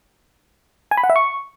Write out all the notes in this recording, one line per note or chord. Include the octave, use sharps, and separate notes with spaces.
G#5
B5
F#5
E5
C#6